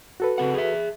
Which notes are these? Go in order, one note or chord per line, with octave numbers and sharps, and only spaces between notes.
F#4 A4 B4
C#3 C4 F#5
G#4 E5